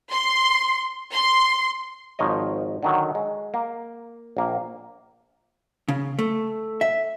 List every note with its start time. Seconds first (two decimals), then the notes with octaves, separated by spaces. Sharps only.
0.12 C6
1.13 C6
2.19 G#1 F3 A#4 C#5 D#5
2.83 D3 D#3 F#3
3.15 G#3
3.54 A#3
4.37 A#1 A#3
5.88 C#3
6.19 A3
6.81 E5